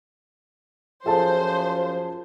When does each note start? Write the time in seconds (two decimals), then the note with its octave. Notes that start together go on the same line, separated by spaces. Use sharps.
1.06 F#2 F3 G#4 A4 C5 A5